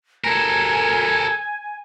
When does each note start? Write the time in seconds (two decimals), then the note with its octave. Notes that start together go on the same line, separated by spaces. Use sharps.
0.24 A4 A#4 G#5